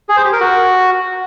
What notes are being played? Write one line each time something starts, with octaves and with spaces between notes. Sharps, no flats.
G#4
C5
G4
A#4
F#4